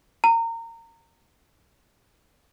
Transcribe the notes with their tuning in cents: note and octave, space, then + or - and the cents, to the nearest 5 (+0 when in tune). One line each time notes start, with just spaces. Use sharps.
A#5 -25